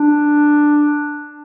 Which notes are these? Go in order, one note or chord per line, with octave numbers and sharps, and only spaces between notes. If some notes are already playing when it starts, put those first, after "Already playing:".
Already playing: D4